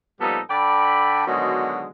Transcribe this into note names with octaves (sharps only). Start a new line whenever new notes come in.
A#2 F3 G3 B3 D#4 A4
D3 A4 D5 G5 B5
B2 D3 D#3 F#3 G#3